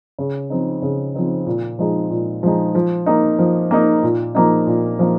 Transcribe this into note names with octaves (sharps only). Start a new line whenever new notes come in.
C#3
F3 C4 D#4
C#3
F3 C4 D#4
A#2
F3 G#3 D#4
A#2
F3 G#3 D#4
F3
A#3 D#4
F3
A#3 D#4
A#2
F3 A#3 D#4
A#2
F3 A#3 D#4